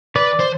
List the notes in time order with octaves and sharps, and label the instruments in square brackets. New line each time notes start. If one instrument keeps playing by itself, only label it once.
[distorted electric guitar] B4 [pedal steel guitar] D5
[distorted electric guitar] C5